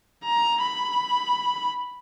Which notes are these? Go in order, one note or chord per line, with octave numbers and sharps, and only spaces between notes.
A#5
B5